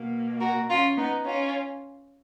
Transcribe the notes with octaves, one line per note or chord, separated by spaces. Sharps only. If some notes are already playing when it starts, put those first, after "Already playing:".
Already playing: B2 A#3
F#4 A#4
C#4 F4
B3 D#4
C#4 F4